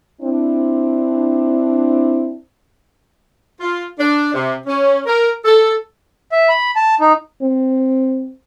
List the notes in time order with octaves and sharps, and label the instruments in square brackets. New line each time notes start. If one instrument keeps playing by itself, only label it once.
[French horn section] C4 D4 E4
[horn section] F4
D4
C3
C#4
A#4
A4
[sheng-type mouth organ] E5
B5
A5
D#4
[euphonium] C4